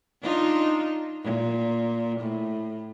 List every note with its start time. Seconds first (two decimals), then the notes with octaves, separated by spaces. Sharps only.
0.22 D4 D#4 F4
1.23 A#2
2.20 A2